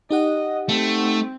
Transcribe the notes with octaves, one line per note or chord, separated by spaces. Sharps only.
D#4 G4 D#5 F#5
A3 C4